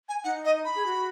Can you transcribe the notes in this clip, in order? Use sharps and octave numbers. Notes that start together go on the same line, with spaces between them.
G#5
D#4 F#5
D#5
B5
G#4
F#4